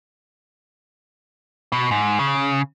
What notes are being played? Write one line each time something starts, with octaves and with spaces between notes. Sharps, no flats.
B2
G#2
C#3